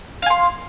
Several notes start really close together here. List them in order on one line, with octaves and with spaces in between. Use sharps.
F5 G#5 C6